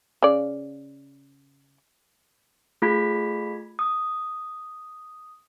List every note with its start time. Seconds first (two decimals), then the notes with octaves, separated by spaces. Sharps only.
0.22 C#3 D5
2.82 A3 F4 G#4 B5 G#6 B6
3.79 D#6